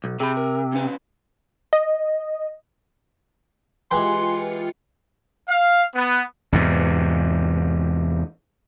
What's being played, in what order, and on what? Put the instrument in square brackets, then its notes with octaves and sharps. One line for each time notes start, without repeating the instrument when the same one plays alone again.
[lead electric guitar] B1
[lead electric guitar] C3 [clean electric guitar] G#4 B5
[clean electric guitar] A#4
D#2 C#4 B4
[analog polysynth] D#5
[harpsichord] E3 G#3 [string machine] F4 C#7 [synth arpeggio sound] G4 B4 G#5 [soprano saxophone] C6
[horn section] F5
B3
[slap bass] E2 G#2 C3